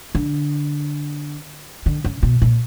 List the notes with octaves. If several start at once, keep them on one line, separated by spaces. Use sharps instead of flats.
D3
D3
C#3
B2
A#2